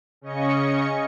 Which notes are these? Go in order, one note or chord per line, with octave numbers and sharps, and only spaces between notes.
C#3 C#4 D#5 C#6 C#7